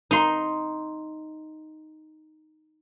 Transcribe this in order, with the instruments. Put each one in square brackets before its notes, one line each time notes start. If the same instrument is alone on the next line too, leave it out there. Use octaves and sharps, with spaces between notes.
[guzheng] D#4 C6